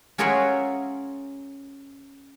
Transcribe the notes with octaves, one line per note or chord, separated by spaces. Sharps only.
C#4 F4 G#4 A#4 E5 F#5